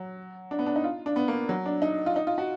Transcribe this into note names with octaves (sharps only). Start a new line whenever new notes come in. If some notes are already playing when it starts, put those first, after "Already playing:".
Already playing: F#3
D4
B3
D4
D#4
F4
D4
B3
A#3
F#3
D4
D#4
F4
D#4
F4
F#4